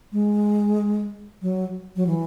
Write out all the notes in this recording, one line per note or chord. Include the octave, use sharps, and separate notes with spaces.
G#3
F#3
F#3
E3